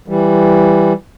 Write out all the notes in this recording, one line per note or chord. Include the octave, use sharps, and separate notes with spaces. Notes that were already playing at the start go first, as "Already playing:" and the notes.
E3 G3